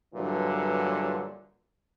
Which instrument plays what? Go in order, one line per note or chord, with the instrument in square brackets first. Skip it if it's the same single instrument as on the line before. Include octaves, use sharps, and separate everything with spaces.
[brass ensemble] G2 A#2 D3 E3 F#3